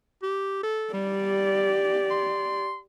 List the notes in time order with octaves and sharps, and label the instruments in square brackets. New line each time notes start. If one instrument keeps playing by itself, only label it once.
[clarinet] G4
A4
[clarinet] G3 [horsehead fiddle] G4 D5
[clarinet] C6